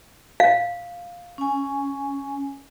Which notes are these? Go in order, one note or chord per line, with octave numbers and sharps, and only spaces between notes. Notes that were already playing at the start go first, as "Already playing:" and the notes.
F5
C#4 G#5